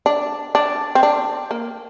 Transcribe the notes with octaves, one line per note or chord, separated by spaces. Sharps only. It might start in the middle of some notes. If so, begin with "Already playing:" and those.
D4
D4
C4
D4
A#3